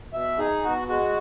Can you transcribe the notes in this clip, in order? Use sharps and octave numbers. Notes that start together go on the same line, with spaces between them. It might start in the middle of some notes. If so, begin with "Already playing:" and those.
B2 E5
D#4 G#4
B2 F#4
G#3 F#4